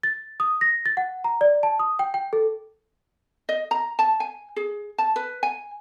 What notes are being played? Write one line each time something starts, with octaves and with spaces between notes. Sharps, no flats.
A6
D#6
A#6
A6
F#5
A#5
D5
A5
D#6
G5
G5
A4
D#5
A#5
A5
G#5
G#4
A5
B4
G#5